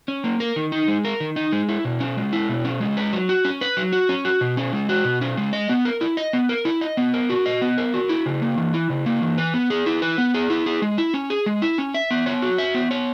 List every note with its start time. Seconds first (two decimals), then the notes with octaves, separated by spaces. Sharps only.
0.08 C#4
0.24 A#3
0.40 A#4
0.56 D#3
0.72 D#4
0.88 G#3
1.05 A#4
1.20 D#3
1.36 D#4
1.52 G#3
1.69 E4
1.85 B2
2.00 C#4
2.17 G#3
2.33 E4
2.49 B2
2.65 C#4
2.80 G#3
2.97 B4
3.13 F#3
3.29 F#4
3.45 C#4
3.61 B4
3.77 F#3
3.92 F#4
4.09 C#4
4.25 F#4
4.41 B2
4.57 C#4
4.73 G#3
4.89 F#4
5.05 B2
5.21 C#4
5.37 G#3
5.53 D#5
5.69 B3
5.85 A#4
6.01 E4
6.17 D#5
6.33 B3
6.49 A#4
6.65 E4
6.81 D#5
6.97 B3
7.14 A#4
7.30 F#4
7.46 D#5
7.62 B3
7.78 A#4
7.94 F#4
8.09 E4
8.26 C#3
8.42 A#3
8.58 E3
8.74 E4
8.90 C#3
9.06 A#3
9.22 E3
9.37 B4
9.54 B3
9.70 G#4
9.86 E4
10.02 B4
10.18 B3
10.34 G#4
10.50 E4
10.66 G#4
10.82 G#3
10.98 E4
11.14 C#4
11.30 G#4
11.46 G#3
11.62 E4
11.78 C#4
11.94 E5
12.11 B3
12.26 C#5
12.42 F#4
12.58 E5
12.75 B3
12.91 C#5